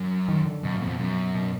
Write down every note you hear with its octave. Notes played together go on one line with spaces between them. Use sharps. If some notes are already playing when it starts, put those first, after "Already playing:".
Already playing: F#2
D#3
D3
F#2 B2
A#2
F2
B2
F#2
B2